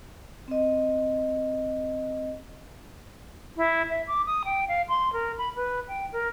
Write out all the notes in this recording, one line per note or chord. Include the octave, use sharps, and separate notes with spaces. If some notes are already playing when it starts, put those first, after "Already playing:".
C4 D#5
E4
E5
D6
D#6
G5
F5
C6
A#4
B5
B4
G5
A#4